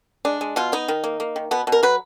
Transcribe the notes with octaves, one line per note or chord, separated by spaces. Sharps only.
G#3 D4
G#3
B2 F4
B3 D#4
D#3
A#3
A#3
D#3
B2 B3
B2
A#4
F#3 B4